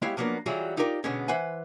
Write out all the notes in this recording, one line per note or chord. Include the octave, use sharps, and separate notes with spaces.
G#3 B3 E4 G4 C#5 F5
F3 F#3 A#3 B3 D4
E3 F#3 G3 F4 F#4 G#4
D#4 F4 G4 A#4 C5 D5
B2 D3 G#3 B3 C#4
E3 B4 C5 F#5 G#5